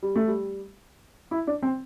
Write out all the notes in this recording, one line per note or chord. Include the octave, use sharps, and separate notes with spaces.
G3
A3
G3
E4
D4
C4